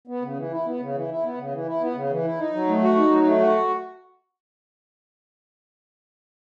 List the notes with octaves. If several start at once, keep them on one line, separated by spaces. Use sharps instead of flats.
B3
C#3
E3
E4
B3
C#3
E3
E4
B3
C#3
E3
E4
B3
C#3
E3
E4
D#4
F#3
A3
F#4
D#4
F#3
A3
F#4